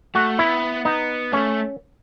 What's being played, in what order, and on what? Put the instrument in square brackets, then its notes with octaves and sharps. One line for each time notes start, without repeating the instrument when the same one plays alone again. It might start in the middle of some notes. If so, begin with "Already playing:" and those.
[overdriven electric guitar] A3 [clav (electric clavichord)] F#4
[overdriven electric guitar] B3 [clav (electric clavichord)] E4
[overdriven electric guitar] B3 [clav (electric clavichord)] D#4
[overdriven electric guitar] A3 [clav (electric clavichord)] C#4